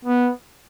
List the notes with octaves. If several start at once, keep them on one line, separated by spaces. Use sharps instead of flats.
B3